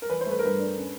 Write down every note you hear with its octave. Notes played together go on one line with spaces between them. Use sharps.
A#4
E3 B4
A3 C5
B4
A#4
G2 B4
D4
C#4